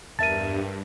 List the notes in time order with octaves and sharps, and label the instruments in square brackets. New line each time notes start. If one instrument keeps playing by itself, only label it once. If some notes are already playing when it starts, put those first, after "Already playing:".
[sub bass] E2 [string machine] G2 [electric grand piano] A#4 E5 A5 [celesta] A6 D#7